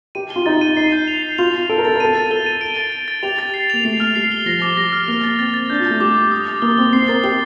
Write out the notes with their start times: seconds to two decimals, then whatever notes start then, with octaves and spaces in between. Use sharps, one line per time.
0.15 G4 D#7
0.30 G7
0.36 F4
0.46 D#4 A6
0.61 D#7
0.77 D#4 C7
0.92 G6
1.08 F7
1.23 C7
1.38 F4 F7
1.54 F7
1.69 A4 D7
1.78 A#4
1.85 A4 A6
1.95 A#4
2.00 A4 D#7
2.16 A6
2.30 A4 G7
2.46 D#7
2.61 D7
2.77 A6
2.92 D7
3.08 A6
3.23 G4 F7
3.39 A6
3.54 C7
3.70 A#3 F7
3.85 A3 C7
4.00 F6
4.16 G3 C7
4.32 G7
4.46 F3 A#6
4.62 D6
4.77 G3 A#6
4.92 F6
5.08 A#3 F7
5.24 A6
5.39 C4 A6
5.54 A6
5.70 D4 G6
5.80 F4
5.85 G6
5.90 A3
6.00 G3 D6
6.16 D6
6.31 D#6
6.47 A6
6.62 A#3 G7
6.78 C4 G7
6.93 C4 C7
7.08 A#4 A6
7.23 G4 G7